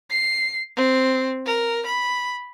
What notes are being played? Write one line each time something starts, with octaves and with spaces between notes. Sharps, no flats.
C7
C4
A#4
B5